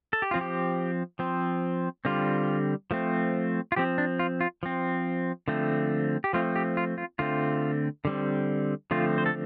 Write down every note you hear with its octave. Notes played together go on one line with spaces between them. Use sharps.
A4
G4
F3 C4 F4
G4
F3 C4
D3 G3 C4 F4
F3 A3 C4
F4
F3 C4 G4
D4
F4
F4
F3 C4
D3 F3 A3 C4
G4
F3 A3 C4 F4
G4
F4
F4
D3 A3 C4 F4
D3 G3 C4
D3 F3 A3 C4 F4
C5
A4